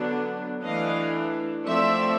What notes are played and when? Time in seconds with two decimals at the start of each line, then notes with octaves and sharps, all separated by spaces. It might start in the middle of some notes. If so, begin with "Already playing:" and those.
Already playing: D3 F#3 B3 D4
0.64 E3 A3 D4 D#5 F5
1.67 F3 A3 C4 D5 E5